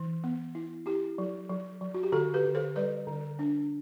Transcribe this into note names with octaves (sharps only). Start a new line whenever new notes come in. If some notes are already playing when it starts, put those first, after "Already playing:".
Already playing: E3
B3
E4
E4 G4
F#3
F#3
F#3
F#4
G4
D3 F#4 A4
G4 B4
D3
A4 C5
G3 B4 D5
D3
D4